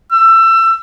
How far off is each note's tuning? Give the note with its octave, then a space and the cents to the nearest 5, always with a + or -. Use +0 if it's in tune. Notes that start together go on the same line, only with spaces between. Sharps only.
E6 +25